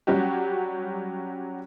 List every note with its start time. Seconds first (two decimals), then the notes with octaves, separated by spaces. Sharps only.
0.07 F#3 G3 C#4 F#4 G4